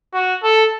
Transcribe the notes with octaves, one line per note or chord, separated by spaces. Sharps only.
F#4
A4